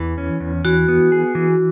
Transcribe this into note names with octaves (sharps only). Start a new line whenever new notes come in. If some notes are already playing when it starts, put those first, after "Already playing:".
Already playing: E2 E3
C#4
E2
E3 F#4
B3
G#4
E3